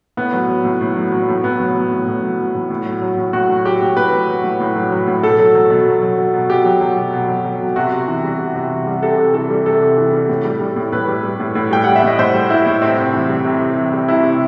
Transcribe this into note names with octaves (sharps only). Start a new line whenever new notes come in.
A2 B3
F#3
F#3
A2
A2
F#3
F#3
A2
A2 B3
F#3
F#3
A2
A2
F#3
F#3
A2
A2
F#3
F#3
A2
A2 F#4
F#3
F#3 G4
A2
A2 B4
F#3
F#3
A2
A2
F#3
F#3
A2
B2 A4
F#3
F#3
B2
B2
F#3
F#3
B2
B2 G4
F#3
F#3
B2
B2
F#3
F#3
B2
C3 F#4
C3
E3
G3
C3
C3
E3
G3
C3 A4
C3
E3 A4
G3
C3 A4
C3
E3
G3
A2
G3
G3
A2
A2 B4
G3
G3
A2
A2
G3 G5
G3 F#5
E5
A2 D#5
A2 C5
G3
G3 E4
A2
C3 C4
C3
E3
G3
C3
C3
E3
G3
C3 E4
C3